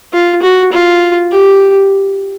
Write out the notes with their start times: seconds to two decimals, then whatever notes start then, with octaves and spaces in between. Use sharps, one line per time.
0.13 F4
0.42 F#4
0.72 F4
1.32 G4